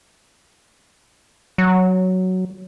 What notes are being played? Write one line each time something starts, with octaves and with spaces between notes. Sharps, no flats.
F#3